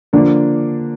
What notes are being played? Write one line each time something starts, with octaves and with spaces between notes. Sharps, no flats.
D3 F3 A#3 D4